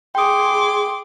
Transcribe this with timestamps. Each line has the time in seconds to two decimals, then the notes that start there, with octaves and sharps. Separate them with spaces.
0.15 G#4 G5 C6 D6 D#6